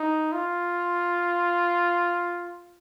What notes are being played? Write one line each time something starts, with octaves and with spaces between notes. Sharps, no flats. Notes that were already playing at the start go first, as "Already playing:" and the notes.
Already playing: D#4
F4